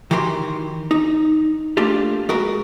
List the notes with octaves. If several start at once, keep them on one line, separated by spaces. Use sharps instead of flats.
D#3 E3 F#4 G4 E5 C6
D#4
A3 A#3 D4 F4 G4
G#3 F#4 A#4 B4